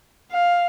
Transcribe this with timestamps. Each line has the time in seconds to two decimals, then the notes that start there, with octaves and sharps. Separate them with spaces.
0.32 F5